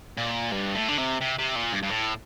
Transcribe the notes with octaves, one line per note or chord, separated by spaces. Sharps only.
A#2
G2
A2
D3
C3
C3
C3
A#2
G2
G2
A2